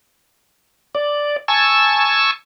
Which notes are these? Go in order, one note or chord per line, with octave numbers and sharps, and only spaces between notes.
D5
G#5 A5 C#6 E6